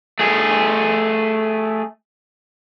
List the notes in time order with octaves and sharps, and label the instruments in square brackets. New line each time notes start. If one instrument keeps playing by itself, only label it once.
[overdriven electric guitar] A3 G#4